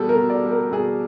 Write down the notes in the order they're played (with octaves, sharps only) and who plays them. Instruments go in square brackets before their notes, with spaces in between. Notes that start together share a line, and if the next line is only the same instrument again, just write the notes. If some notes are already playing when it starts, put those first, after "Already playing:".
Already playing: [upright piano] B2 G3 G#4 A4
A#4
B2
D5
G3
A#4
B2 G#4